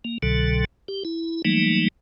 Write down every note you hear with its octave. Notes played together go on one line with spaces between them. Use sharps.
A#3
C2 B2 D3 F#3 A4
G4
E4
E3 F#3 G3 A3 A#3 D#4